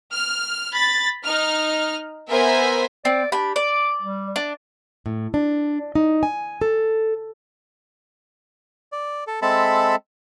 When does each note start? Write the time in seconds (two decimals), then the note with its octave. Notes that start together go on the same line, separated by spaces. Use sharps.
0.12 F6
0.72 B5 A6
1.24 D#4 F6
2.29 B3 A#4 C5 E5 G#5
3.05 C4 D5
3.32 D4 G4 B5
3.56 D5 D6
4.02 G3
4.36 D4
5.06 A2
5.34 D4
5.95 D#4
6.23 G#5
6.61 A4
8.92 D5
9.27 A4
9.42 G#3 C4 A4 E5 A5 B5